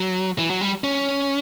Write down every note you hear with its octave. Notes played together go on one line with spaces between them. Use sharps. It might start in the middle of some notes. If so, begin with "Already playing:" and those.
Already playing: F#3
E3
F#3
G3
C#4